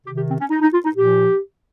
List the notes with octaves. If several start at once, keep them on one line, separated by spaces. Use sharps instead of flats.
C3 D#3 G4
G4
C4
C#4
D#4
D#4
F4
D#4
A#2 F3 G4